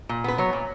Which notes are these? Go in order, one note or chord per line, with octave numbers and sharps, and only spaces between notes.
A#2
B3 B4
F#3 C#5
A#2